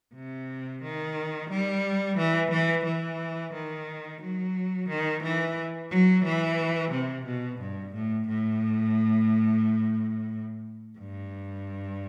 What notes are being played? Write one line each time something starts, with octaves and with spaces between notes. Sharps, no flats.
C3
D#3
G3
E3
E3
E3
D#3
F#3
D#3
E3
F#3
E3
C3
B2
G2
A2
A2
G2